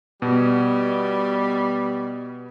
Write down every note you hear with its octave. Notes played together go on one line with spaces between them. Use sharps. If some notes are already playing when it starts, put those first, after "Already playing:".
B2 G3